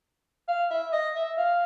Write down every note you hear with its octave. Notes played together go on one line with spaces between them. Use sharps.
F5
E5
D#5
E5
F5